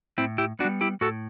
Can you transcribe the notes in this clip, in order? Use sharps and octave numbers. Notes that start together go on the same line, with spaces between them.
A2 C4 E4
E4 G4
B3 D4 F#4
G3
E4 G4
A2 F#4 A4